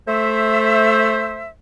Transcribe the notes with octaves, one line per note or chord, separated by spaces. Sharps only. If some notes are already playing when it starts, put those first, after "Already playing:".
A3 C5 E5